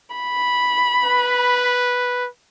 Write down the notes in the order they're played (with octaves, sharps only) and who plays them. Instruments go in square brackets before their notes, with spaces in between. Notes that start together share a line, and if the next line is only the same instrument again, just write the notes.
[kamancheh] B5
[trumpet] B4